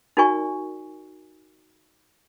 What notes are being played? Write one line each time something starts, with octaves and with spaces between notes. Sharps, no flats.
D#4 F#4 A#4 D5 G#5 C#6